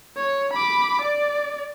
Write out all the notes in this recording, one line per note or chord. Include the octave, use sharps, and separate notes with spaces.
C#5
B5 D6
D5